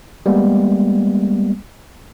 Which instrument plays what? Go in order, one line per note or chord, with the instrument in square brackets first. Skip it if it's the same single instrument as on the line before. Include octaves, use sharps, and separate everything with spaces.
[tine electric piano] G3 G#3 A#3 B3